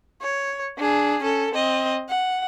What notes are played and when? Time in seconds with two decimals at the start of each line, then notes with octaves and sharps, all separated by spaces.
0.22 C#5
0.78 D4 G#4
1.23 C#4 A4
1.54 C4 D#5
2.09 F#5